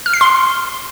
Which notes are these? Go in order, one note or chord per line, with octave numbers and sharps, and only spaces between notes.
F6
C7
C6